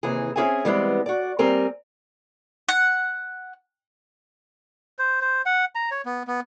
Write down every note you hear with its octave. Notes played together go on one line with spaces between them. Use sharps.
D#2 C3 E3 G#4
C4 C#4 F#4 G#4 E5 G#5
D3 E3 G3 G#3 B3 C4
F#4 D5
G3 C4 A#4 G#5
F#5
C5
C5
F#5
A#5
C#5
B3
B3